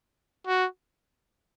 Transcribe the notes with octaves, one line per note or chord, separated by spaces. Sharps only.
F#4